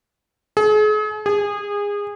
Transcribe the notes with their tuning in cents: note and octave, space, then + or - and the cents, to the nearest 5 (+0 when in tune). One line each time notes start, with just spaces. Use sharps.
G#4 +40
G#4 -25